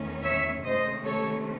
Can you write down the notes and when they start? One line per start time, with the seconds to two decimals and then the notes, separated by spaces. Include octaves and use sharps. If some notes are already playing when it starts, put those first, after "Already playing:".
Already playing: E2 D#3 A3 C#4
0.23 C#5 E5
0.64 C3 D#3 A3 C#4 C5 D#5
1.04 A4 C#5